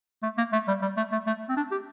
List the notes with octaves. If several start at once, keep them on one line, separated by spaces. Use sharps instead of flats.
A3
A#3
A3
G3
G3
A3
A3
A3
C4
D4
G4